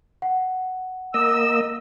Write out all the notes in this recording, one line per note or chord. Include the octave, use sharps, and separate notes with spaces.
F#5
A#3 D#5 E6